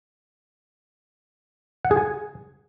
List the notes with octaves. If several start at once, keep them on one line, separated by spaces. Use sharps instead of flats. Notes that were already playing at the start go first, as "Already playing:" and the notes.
F#5
G#4
G#5